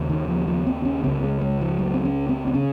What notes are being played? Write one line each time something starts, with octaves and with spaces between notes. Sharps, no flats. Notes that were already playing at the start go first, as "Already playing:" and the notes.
Already playing: D#2 C#3
D#3
F3
F3
C4
C#4
C#2 C#3 C4
G#3
G#3
F3
F#3
C4
C#4
C4
C4
C#3 C#4